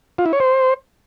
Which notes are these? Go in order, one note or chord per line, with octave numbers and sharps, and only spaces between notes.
F4
E4
C#5
C5